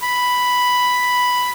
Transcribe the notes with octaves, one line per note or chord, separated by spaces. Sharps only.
B5